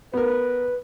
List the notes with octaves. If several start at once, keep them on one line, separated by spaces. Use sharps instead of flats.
B3 A#4 B4